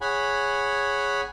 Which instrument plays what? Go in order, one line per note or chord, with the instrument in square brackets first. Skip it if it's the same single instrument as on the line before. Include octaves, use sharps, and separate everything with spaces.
[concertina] G#4 C#5 F#5 G#5 B5